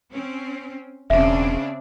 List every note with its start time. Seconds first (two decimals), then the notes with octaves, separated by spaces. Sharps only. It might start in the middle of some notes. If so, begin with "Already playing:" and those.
0.10 C4 C#4
1.10 E1 C#3 C4 D4 E5